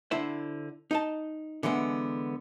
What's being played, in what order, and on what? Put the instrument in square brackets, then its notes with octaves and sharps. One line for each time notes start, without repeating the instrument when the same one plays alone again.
[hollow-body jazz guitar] D3 E4 C5 E5
D#4 D#5 A5
D3 E3 G#3 B3